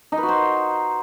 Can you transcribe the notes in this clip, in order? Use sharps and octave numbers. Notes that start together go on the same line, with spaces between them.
D#4
B4
F#4
C5